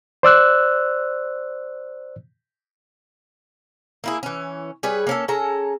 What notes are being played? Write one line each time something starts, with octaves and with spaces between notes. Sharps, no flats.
C5 D5 E6 F#6
A#3 E4 G#4
E3 C#4
G3 G#4 B4 C#5
A#3 C#4 A4
C#4 G#4 A4 A#5